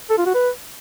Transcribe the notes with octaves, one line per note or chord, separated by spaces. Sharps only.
A4
F4
F#4
B4